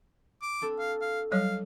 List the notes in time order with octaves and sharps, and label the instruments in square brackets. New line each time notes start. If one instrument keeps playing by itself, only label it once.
[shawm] D6
[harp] C4 D4 A4
[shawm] F5
F5
[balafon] F#3 G3 C#5 [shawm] F5